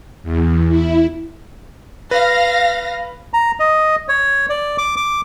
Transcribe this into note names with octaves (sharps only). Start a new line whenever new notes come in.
E2
E4
B4 F5 A#6
A#5
D#5
C#5
D5
D6
D6